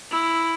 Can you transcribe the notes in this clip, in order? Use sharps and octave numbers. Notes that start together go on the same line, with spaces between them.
E4